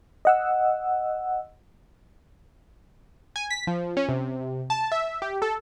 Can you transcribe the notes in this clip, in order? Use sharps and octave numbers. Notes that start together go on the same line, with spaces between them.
D#5 F#5 E6
G#5
B6
F3
C#4
C3
A5
E5
G4
A4